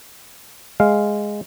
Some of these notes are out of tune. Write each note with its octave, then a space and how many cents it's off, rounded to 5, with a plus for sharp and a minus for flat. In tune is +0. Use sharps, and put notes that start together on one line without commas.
G#3 +0 F5 +0